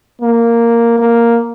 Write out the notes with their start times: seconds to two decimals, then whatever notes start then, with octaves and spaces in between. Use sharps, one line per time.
0.21 A#3
0.98 A#3